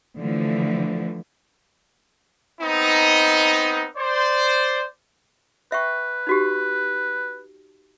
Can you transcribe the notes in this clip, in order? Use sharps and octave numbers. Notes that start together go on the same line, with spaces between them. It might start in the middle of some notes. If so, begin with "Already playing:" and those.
D3 E3 F3 A3
B3 C4 D#4
C5 D5
B4 E5 G5 C#6
D#4 F#4 G4